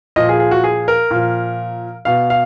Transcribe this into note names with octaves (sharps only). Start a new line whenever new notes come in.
A#2 F3 D#5
G#4
G#4
F#4
G#4
A#4
A#2 F3
B2 F5
F5